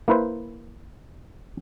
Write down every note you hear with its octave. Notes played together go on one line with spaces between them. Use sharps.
A#3 E4 B4 C5